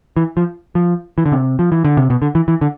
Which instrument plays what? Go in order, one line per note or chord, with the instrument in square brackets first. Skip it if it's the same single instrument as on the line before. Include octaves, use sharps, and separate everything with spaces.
[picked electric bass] E3
F3
F3
E3
D3
C3
F3
E3
D3
C3
B2
D3
E3
E3
D3